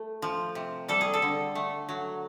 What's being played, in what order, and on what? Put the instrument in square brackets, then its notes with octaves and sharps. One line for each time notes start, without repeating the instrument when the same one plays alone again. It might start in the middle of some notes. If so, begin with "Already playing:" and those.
Already playing: [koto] A3
F3
C3
G3 A4
G#4
A4
D3
A3
F#3